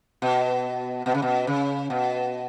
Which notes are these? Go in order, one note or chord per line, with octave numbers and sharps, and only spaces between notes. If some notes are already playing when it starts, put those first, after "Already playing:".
B2
B2
C#3
B2
C#3
B2